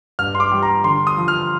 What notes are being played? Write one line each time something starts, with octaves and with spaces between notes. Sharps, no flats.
G2 F6
C6
D6
G3
A#5
D3 C6
D#6
F3
F6